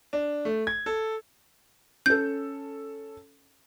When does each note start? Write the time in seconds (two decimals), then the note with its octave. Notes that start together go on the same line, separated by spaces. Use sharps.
0.13 D4
0.45 A3
0.67 G#6
0.86 A4
2.06 C#4 A4 G6